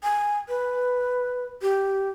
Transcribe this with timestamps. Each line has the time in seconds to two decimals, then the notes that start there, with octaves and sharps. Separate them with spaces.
0.03 G#5
0.49 B4
1.62 G4